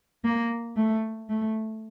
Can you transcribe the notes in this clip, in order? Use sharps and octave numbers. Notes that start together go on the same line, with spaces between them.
A#3
A3
A3